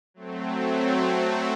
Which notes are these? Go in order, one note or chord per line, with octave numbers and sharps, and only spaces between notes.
F#3 A3 C4